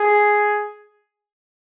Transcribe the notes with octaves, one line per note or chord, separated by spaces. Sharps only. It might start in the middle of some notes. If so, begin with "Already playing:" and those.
Already playing: G#4